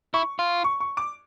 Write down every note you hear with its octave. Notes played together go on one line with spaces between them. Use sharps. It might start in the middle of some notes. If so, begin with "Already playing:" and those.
E4 C#6
F4
C#6
C#6
D6